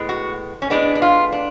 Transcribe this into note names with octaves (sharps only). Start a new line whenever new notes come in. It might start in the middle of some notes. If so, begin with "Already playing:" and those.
Already playing: A2 G#3 B3
F#4
C#4
A2 G#3 B3 D4
D4
F4
D4